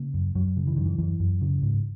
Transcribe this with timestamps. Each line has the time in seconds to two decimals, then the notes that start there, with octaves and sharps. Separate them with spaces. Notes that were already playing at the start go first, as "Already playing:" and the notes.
Already playing: C#3 A#3
0.14 F#2
0.35 F#2 F#3
0.57 C#3
0.67 E3
0.76 F#2 D#3
0.85 E3
0.98 F#2 E3
1.20 F#2
1.41 C#3
1.62 G#2